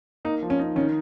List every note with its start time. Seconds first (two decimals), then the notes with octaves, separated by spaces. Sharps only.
0.25 A#3 D#4
0.43 F3
0.50 C#4
0.59 D#4
0.76 D#3 C#4